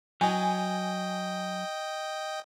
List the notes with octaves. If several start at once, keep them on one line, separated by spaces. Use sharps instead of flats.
F#3 D#5 G5 G#5